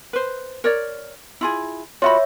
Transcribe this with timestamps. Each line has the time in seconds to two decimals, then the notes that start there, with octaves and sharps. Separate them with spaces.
0.13 B4 C5
0.64 A#4 C#5 D5
1.41 E4 F4 G#4
2.02 F4 F#4 C#5 E5 B5